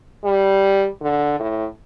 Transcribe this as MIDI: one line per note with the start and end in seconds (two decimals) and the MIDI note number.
0.24 0.87 55
1.02 1.37 50
1.40 1.66 45